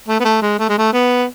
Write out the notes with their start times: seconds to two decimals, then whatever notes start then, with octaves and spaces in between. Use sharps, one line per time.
0.08 A3
0.20 B3
0.25 A3
0.42 G#3
0.59 A3
0.69 G#3
0.78 A3
0.93 B3